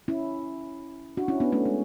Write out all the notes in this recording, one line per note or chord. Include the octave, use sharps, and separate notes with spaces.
C#4 E4
D4 F#4
C#4 E4
B3 D4
A3 C#4
G#3